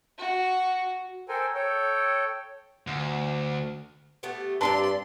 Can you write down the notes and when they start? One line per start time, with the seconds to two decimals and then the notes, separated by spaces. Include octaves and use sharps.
0.18 F#4
1.29 A4 A#4 C5 G5 G#5
1.55 A4 C#5 G5
2.87 D2
4.23 A3 B3 G4
4.61 G2 C4 G4 D5 A5 A#5 C6